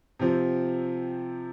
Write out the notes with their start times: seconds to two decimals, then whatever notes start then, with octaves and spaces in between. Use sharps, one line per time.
0.19 C3 F3 C4